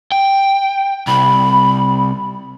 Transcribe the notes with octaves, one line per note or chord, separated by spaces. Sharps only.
G5
C2 B5